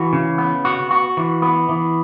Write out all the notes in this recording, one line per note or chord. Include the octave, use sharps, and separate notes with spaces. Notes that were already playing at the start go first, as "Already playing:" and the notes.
Already playing: E3 F#4
C#3
B3
F#4
F#4
E3
B3
E3